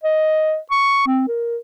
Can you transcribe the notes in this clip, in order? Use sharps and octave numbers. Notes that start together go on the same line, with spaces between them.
D#5
C#6
C4
A#4